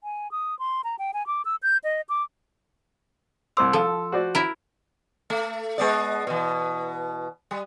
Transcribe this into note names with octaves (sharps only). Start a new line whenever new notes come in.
G#5
D#6
C6
A#5
G5
G#5
D6
E6
G6
D#5
D6
C2 C5 C6 D6 E6
F3 A4
F#4 C5 D5
E4 A#4
A3
G#3 B3 D5
B2 E3
G3